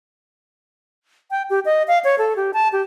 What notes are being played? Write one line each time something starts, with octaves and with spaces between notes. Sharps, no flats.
G5
G4
D#5
F5
C#5
A4
G4
A5
G4